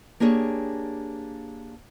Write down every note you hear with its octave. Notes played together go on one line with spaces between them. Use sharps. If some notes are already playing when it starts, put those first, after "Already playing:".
A#3 D4 G4 G#4 C#5